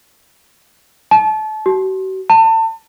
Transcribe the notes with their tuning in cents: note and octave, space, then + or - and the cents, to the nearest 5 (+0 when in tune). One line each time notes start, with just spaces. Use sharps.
A5 -30
F#4 +40
A5 +30